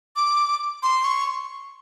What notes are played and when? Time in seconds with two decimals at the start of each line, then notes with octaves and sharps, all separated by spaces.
0.16 D6
0.83 C6
1.04 C#6